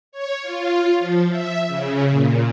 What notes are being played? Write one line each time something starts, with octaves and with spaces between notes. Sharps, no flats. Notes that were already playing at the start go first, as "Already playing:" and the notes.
C#5
F4
F3
E5
C#3
A#2